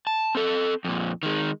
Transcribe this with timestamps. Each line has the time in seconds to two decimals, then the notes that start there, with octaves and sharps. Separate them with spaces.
0.07 A5
0.35 C4 A4
0.85 F2 A#2
1.23 D#3 G#3